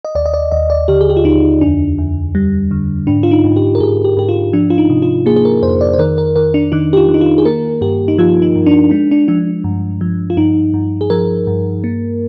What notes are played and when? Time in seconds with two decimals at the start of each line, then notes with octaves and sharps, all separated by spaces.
0.05 D#5
0.15 D#2 D5
0.26 D#5
0.34 D5
0.52 D#2 D#5
0.70 D5
0.88 D3 G4
1.01 G#4
1.10 G4
1.17 F4
1.24 D#2 D#4
1.61 F2 D4
1.98 F2
2.35 G3
2.71 D3
3.07 G#2 D4
3.23 F4
3.31 D#4
3.44 G#2
3.56 G4
3.75 A#4
3.80 G#2 G#4
4.04 G4
4.17 G#2 G4
4.29 F4
4.53 F3 D4
4.70 F4
4.78 D#4
4.90 C3
5.02 F4
5.26 A#3 G#4
5.36 G#4
5.45 A#4
5.62 F2 C5
5.81 D5
5.93 C5
5.99 D#3 A#4
6.18 A#4
6.36 D#3 A#4
6.54 D4
6.72 D#3 D#4
6.93 G4
6.97 F4
7.08 D#3
7.14 D#4
7.21 F4
7.38 G#4
7.45 A#3 A#4
7.81 G2 G4
8.08 D#4
8.18 F3 F4
8.42 D#4
8.55 G2
8.66 D4
8.91 G#3 D4
9.11 D4
9.28 F3 D4
9.64 G2
10.01 F3
10.30 F4
10.37 G2 D#4
10.74 G2
11.01 G#4
11.10 F3 A#4
11.47 G2
11.84 A#3